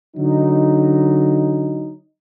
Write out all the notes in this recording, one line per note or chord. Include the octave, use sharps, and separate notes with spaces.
D3 F#3 D#4